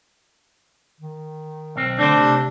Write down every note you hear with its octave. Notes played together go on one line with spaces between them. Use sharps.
D#3
B1 C4
D3 A3 C4 D4 C5
C3